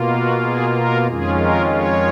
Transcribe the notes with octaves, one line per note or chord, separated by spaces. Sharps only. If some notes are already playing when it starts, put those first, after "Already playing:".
Already playing: B2 A#3 F4
F#4
G#4
A#4
F2 D#3 G#3 C#4 F4 G#4
A#4
C#5